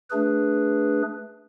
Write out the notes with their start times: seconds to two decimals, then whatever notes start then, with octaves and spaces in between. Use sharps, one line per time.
0.10 A3 D4 G#4 B4